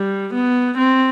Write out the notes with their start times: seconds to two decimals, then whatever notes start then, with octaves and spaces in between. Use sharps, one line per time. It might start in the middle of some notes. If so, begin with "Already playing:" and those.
Already playing: G3
0.34 B3
0.78 C4